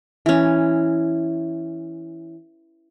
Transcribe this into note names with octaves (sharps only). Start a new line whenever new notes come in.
E3 C#4